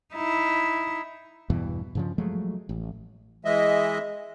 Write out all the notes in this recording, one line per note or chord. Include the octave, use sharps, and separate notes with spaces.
D#4 E4
E2 G2 B2 E3
G2 C#3 F3
F3 F#3 G#3 A3
A1
E3 G#3 D#5 E5